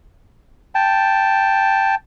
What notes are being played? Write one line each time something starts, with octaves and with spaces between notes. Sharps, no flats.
G5 A5